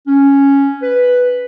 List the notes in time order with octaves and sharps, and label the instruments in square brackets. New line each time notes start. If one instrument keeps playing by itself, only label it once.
[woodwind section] C#4
B4